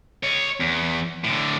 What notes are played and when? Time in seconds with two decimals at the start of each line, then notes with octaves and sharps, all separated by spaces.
0.23 C#5 D#5
0.60 E2
1.25 A2 D3